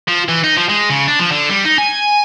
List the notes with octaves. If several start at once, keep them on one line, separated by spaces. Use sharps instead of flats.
F3
E3
D#4
F3
G#3
C#3
D4
F3
D3
G3
D#4
G#5